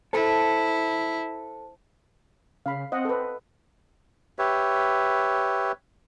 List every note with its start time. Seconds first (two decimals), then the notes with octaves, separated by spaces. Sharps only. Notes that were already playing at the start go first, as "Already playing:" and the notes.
0.13 E4 A4 C5 A5
2.66 C#3 F5 B5
2.92 C4 D#5 F#5
3.05 A4 B4
4.39 G4 B4 C#5 E5